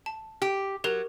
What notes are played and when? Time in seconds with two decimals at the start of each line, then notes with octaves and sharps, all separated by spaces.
0.06 A5
0.42 G4
0.84 F#3 G4 A#4 F7